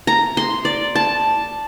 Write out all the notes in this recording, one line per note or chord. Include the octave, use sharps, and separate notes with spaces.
A#5
C6
D5
A5